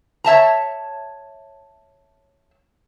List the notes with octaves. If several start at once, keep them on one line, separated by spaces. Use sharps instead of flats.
C#5 E5 A5 A#5